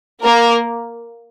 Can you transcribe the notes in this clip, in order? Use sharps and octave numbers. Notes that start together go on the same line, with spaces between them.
A#3 A#4